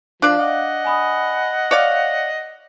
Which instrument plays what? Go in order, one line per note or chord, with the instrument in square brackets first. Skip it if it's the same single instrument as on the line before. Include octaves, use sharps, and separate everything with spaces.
[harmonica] F3 [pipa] D4 D5 [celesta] F5
[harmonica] D#5 F#5
[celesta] G#5 B5 D#6
[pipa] C#5 D5 F5 [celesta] F#6